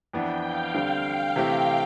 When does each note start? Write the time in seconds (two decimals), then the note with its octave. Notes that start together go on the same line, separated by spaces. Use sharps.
0.13 F2 E3 B3 D4 G5
0.44 F5
0.74 D2 D3 G3 C4 G5
1.36 C3 E3 A3 C4 G4